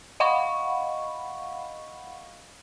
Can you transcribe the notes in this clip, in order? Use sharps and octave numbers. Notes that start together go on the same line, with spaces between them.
D#5 F5 F#5 B5 C#6